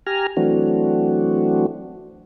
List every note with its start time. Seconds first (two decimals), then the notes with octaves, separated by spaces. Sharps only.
0.07 G4 G#5 A#5 F6
0.37 E3 F#3 A3 C4 D4 F#4